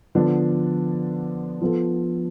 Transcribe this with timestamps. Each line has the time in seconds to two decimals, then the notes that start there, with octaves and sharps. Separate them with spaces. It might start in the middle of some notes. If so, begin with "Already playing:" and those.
0.15 D3 F3 B3 D4
1.61 F3 B3 F4 A4